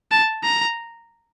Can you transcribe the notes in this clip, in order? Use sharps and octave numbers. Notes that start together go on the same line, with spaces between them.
A5
A#5